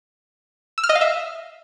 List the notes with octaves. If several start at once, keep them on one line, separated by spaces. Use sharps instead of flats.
E6
F6
D#5
F5
E5